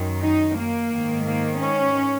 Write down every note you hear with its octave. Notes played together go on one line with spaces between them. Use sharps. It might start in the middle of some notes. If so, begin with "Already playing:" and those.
Already playing: F#2 D#3
D#4
A#3
G#2 D#3
A#3
C#4